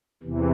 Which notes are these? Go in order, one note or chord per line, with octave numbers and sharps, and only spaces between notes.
E2 C3 E3